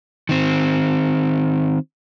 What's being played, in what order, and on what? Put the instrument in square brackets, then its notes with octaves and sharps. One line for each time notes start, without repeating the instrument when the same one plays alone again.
[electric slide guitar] D#3 C4